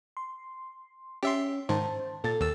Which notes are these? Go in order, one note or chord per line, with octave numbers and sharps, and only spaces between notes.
C6
C#4 G4 E5 C6
G#2 D#3 C5 A5
A#2 A4 A6
D#2 E6